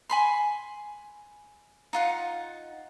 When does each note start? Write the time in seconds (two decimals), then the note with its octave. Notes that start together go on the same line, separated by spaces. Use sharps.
0.10 G#5 B5 C6
1.93 D#4 F4 F#5